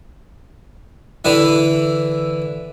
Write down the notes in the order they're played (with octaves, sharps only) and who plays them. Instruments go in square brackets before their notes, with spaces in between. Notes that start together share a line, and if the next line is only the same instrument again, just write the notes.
[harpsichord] D3 E3 E4